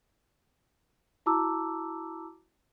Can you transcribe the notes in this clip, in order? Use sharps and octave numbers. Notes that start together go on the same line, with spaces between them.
E4 F#4 A5 A#5 D6 E6